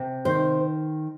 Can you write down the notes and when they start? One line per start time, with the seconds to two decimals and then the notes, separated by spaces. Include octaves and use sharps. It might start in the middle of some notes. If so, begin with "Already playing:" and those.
Already playing: C3
0.25 D#3 C5